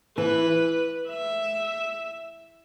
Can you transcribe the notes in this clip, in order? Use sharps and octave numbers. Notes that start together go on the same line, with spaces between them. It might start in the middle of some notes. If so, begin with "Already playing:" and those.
E3 B4
E5